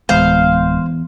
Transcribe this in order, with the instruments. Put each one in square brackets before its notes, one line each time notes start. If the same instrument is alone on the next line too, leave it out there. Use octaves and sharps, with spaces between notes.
[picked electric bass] D1 G#3 [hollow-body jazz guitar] E2 [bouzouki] C5 F5